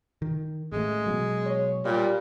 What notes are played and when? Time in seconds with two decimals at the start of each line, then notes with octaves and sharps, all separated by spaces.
0.22 D#3
0.72 A1 G#3 A3
1.06 B2 F#3
1.46 C#5
1.85 A#2 G3